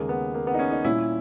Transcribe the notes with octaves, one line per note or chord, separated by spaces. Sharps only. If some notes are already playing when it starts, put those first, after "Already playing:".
Already playing: D#2 C#3 G#3 A#3
B3
A#3
B3
D#4
C#4
D#4
A#2 G3 C#4 E4 G4